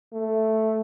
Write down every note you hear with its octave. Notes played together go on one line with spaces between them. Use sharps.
A3